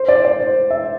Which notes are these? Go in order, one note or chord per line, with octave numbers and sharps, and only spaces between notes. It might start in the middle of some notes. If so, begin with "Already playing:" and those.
Already playing: C5
D5
D5
C5
E5